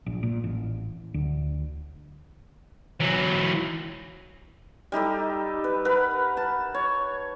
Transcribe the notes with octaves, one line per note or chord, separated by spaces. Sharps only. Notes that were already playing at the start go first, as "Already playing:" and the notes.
A#1
A#2
A1
D2
E3 F#3
G3 D#4 G4 A4
B4
A#4 B4 F#5 B5
A5
C#5